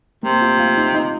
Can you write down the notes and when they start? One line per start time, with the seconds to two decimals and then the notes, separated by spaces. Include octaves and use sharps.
0.23 C3 A#3
0.41 F4
0.59 F4
0.77 D#4
0.95 D#4